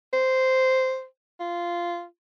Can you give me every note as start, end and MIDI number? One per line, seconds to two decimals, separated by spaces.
0.13 1.04 72
1.40 2.05 65